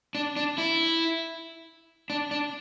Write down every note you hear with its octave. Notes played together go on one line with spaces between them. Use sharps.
D4
D4
E4
D4
D4